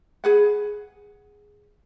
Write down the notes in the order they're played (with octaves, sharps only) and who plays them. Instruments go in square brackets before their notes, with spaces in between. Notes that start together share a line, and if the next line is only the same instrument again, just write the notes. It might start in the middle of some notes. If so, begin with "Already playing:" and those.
[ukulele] G#4 B4 F#5